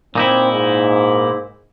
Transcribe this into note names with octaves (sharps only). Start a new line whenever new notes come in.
A#2 C4 D#4 E4
G#2